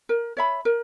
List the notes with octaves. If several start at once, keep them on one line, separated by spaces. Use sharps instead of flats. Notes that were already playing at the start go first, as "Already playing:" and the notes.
A#4
C#5 E5 B5
A#4